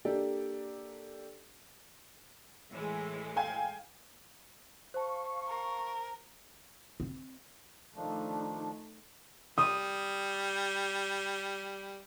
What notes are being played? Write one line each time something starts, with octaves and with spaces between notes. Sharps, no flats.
A#3 D4 G4 A4 D5
A2 E3 G#3
F5 G5 G#5
C5 F5 A5 C#6
A#4
C4
D#3 F3 A3 D4 D#4
G3 D#6